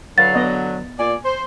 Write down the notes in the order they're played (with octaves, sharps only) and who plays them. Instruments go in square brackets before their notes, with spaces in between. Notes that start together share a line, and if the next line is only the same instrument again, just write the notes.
[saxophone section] D3 F#3 [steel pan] B4 F5 F#5 [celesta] A6
[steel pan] B3 D5 D#5
[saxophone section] A#2 D5 [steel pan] G#5
[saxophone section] C5